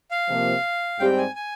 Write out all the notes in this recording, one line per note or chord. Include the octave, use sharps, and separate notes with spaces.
F5
C3 F3 A#3
G#2 G3 C4 G4 G5
G#5
G#5